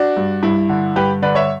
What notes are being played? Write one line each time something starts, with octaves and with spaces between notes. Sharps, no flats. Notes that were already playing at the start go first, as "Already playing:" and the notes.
Already playing: D4 F#4
G2
G2 E4
D3
G2 G4 B4
D3 B4 D5
C#5 E5